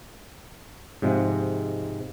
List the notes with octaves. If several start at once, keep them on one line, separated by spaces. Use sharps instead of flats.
G#2 C3 F3 G#3